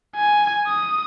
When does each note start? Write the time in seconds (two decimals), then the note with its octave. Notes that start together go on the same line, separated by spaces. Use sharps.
0.16 G#5
0.68 D#6